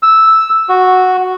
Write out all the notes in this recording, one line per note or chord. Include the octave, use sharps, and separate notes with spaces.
E6
F#4